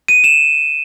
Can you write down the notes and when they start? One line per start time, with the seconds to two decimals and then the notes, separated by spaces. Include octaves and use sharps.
0.08 D#7
0.24 E7